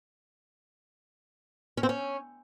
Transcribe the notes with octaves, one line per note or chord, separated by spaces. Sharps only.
C#4
C4
C#4